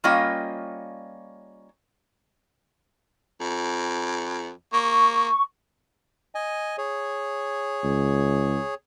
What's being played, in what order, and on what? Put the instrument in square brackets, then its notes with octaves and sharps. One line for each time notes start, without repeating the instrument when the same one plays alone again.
[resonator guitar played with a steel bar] G3 A#3 C#4 F4 D#5 G5
[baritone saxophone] F2
[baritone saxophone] A#3 [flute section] C#6
[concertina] D#5 G#5
G#4 C#5
[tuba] C#2